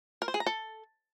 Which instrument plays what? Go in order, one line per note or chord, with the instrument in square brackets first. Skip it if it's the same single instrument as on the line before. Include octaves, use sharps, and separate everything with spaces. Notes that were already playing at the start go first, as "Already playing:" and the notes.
[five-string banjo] A#4
C5
G#4
A#5
A4